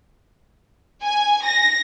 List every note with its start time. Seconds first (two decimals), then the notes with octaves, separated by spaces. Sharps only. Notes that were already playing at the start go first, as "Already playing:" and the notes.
1.03 G#5
1.45 A#6